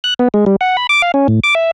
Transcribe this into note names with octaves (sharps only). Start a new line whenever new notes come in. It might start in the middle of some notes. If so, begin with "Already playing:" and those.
F#6
B3
G#3
G3
F#5
B5
D6
F5
C#4
A2
D6
E5